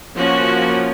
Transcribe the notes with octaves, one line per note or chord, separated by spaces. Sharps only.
F3 A#3 C#4 F#4